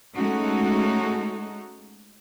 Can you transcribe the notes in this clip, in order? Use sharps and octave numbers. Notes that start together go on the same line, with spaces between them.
G#3 A3 C#4 D#4 F#4 A4